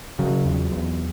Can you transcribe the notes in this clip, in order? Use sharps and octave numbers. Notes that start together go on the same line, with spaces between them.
C#3 F#3
E2
E2